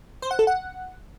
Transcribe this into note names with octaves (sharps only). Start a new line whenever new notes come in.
C5
F#5
A4
F#5